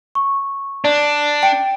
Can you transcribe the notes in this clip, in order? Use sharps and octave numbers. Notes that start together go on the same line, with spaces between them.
C#6
D4 D5
G5 D7